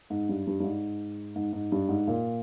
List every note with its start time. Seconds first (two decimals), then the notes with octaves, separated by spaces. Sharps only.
0.10 G#2
0.29 G2
0.47 G2
0.60 G2
0.64 G#2
1.36 G#2
1.53 G#2
1.72 G2
1.89 G#2
2.08 A#2